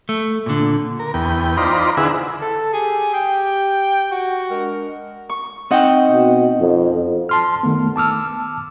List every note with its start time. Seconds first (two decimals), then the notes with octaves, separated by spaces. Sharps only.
0.09 A3
0.46 A#2 D3
0.99 A#4
1.14 E2 B3 G5
1.57 D#4 F4 C5 D5 A#5 B5
1.97 D3 E4 G#4 B4 F#5 E6
2.41 A4
2.73 G4 G#4
3.14 G5
4.12 F#4
4.50 G#3 D4 A#4
5.29 C#6
5.71 C4 D#4 D#5 F#5 G5
6.12 B2
6.60 F2
7.29 A5 C6 F6
7.63 D#3 A3 B3
7.96 A5 D6 E6 F6